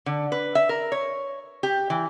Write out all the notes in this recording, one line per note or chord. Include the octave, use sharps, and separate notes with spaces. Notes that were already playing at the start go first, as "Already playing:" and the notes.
D3
B4
E5
A#4
C#5
G4
E3